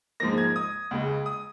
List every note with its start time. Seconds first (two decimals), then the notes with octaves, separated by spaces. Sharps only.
0.20 G#2 F3 A#3 A#6
0.38 G#6
0.56 D#6
0.91 C#2 C#3 G#3
1.26 D#6